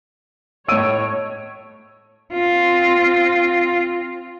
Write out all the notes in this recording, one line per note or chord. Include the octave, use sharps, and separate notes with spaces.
A2 C#5 D#5 E6 D7 D#7
C4 F4